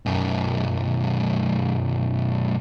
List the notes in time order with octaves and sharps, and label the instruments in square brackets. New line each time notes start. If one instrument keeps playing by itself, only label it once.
[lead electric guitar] B1 F#2